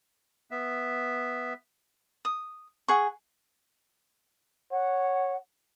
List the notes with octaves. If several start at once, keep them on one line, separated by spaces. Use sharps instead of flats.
B3 E5
D#6
G#4 F#5 C#6
C#5 F#5